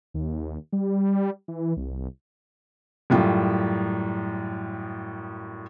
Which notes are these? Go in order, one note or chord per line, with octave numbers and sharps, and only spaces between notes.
D#2
G3
E3
C2
F#2 A2 G3 F4